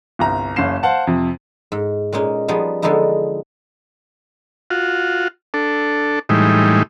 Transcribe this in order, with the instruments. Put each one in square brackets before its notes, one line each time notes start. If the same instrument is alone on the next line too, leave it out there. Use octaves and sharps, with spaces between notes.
[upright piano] G1 C2 A#5
F#1 C#4 F5 C7 E7
C5 F5 F#5 A5
F2 C3
[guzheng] G#2
A#2 G#3 C#4 D#4
F3 G3 B3 D#4 G#4
D3 F3 G#3 B3 D#4 E4
[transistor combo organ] F4 F#4
D4 A4
A2 E3 G3 G#3 D#4